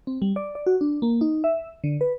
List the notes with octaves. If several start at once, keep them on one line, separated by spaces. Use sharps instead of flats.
C4
G3
D5
D5
F#4
D4
A#3
D#4
E5
D3
B4